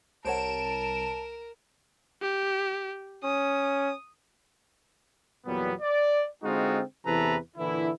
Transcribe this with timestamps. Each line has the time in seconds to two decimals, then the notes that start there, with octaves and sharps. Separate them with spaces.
0.25 C2 A#4 C5 C#5 F#5 A5 D7 E7
2.22 G4
3.24 C#4 D#6
5.46 E2 A#2 F#3 G3 B3
5.81 D5
6.44 D3 G#3 C4 D#4 F4 F#4
7.05 E2 C3 E3 A4 B4 A#5
7.57 A#2 D3 E3 E4